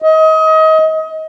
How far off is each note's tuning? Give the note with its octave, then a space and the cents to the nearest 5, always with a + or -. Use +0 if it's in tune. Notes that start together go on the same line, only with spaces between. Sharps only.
D#5 +30